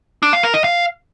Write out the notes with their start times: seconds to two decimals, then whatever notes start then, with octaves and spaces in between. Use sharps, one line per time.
0.23 D4
0.33 F5
0.43 A#4
0.54 D#5
0.64 F5